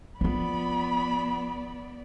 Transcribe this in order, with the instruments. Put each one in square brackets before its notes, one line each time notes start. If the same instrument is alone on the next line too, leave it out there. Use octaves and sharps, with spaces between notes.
[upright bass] F3 F4 [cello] B3 D5 [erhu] B5